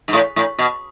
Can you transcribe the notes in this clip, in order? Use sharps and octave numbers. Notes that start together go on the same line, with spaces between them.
G#2
A2
A2
B2